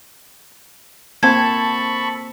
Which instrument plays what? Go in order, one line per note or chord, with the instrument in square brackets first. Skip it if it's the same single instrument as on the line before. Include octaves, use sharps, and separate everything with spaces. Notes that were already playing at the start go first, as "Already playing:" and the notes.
[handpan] A#3 C4 C5 [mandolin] A4 [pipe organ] A5 B5 C#6 [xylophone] G#6